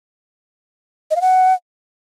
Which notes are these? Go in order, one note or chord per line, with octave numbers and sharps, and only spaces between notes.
D#5
F5
F#5